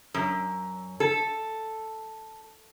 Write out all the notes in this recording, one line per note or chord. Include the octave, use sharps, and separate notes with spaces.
F#2
A4